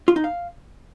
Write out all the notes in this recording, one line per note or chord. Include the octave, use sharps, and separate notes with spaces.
F4
D#4
F5